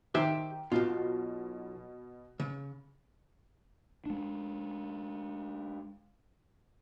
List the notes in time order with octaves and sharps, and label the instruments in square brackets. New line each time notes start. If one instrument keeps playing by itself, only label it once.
[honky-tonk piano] D#3 [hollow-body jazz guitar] G4 C5 E5
[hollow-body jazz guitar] B1 F4 [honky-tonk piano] B2
[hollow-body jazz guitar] C#3
[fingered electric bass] G#3 D4